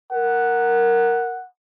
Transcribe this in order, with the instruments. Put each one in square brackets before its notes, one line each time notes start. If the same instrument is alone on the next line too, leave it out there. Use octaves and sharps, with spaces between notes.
[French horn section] A#4 [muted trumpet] F#5